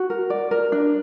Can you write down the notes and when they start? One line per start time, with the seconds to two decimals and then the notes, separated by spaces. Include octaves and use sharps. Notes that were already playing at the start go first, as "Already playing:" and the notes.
Already playing: F#4
0.10 A#4
0.30 D5
0.51 A#4
0.72 D4